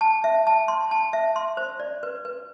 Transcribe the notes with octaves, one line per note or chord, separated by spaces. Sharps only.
A5
E5
A5
C6
A5
E5
C6
C5
D5
B4
B4